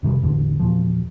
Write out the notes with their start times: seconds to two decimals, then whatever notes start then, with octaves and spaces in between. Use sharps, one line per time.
0.03 F1 C3 D#3 G3
0.22 A1 E2 A2 D3
0.59 E2 A#2 F3